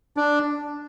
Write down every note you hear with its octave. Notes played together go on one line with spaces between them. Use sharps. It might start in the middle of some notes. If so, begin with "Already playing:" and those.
D4